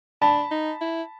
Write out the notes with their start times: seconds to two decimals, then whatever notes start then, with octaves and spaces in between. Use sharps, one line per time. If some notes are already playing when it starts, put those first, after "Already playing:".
0.22 D4 A5 B5
0.51 D#4
0.81 E4